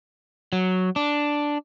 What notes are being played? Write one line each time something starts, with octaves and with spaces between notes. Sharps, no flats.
F#3
D4